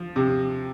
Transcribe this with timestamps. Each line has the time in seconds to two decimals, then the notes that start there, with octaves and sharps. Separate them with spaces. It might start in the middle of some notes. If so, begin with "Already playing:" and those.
Already playing: F3
0.16 C3